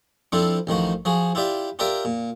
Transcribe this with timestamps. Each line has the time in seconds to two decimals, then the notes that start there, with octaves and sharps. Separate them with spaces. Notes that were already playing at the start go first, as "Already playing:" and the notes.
0.32 F3 C4 D4 E4 F4 A4
0.67 A1 D#3 F3 F#4
1.05 F3 F#4 G#4
1.35 E4 F4 G4 D5 E5
1.79 F4 G4 A#4 D5 E5 G5
2.05 A#2